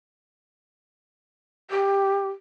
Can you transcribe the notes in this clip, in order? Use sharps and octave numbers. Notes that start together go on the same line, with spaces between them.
G4